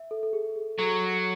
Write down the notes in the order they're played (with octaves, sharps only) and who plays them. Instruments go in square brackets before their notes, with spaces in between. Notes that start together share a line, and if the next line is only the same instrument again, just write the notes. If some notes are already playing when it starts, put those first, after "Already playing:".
Already playing: [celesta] E5
A4
A4
G#4
G#4
[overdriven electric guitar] F#3 [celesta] A4